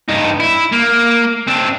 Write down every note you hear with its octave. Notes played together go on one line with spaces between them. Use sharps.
G2 D#4
E4
A#3
C4 D4